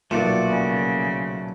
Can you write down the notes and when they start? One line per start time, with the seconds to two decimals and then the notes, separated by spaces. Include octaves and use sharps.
0.11 B1 A#2 F3 A3 A#3 F4 F#4 D5
0.48 C#3